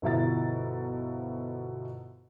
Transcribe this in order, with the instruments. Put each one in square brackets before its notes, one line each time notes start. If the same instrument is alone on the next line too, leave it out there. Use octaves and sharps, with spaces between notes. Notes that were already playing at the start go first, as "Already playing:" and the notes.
[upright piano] G1 B2 F3 E4 A#5 A6